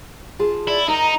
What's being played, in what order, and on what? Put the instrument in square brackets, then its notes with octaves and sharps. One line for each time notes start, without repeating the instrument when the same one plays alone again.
[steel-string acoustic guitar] F4 G#4 A5
[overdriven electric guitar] E4 [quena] D5
[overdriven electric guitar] D#4 [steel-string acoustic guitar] A#4 [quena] A#5